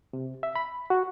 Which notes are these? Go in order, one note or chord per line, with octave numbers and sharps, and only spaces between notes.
C3
E5
B5
F#4